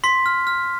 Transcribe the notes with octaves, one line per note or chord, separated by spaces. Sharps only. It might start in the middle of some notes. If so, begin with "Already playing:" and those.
C6 B6
F6
F6